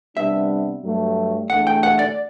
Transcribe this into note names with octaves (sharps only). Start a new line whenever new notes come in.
C3 G3 B3 D4 E5
G2 F#3 A3
E2 D3 A3 F#5
G5
F#5
D5